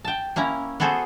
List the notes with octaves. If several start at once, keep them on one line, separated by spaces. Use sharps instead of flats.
G5 A5
A#3 C#4 E4 A#5
B3 F#4 G#4 A4 C5